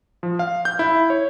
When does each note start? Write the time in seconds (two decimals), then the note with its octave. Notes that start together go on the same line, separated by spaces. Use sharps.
0.23 F3
0.39 F5
0.65 G6
0.79 E4
1.10 C#5